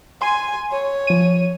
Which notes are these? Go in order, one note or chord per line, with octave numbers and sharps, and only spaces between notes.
G#5 C6 D#7
C#5
F3 D#7